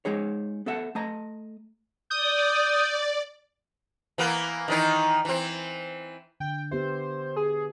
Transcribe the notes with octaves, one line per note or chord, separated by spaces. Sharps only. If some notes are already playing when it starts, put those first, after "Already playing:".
G#3 D#4 G#4 C#5
B3 A4 E5 F#5
A3 D#5 A#5
D5 D#6 G6
E3 A#3 B3
D#3 E3 D#4
E3 C4
D3 G5
B3 G4 C5 E5
G#4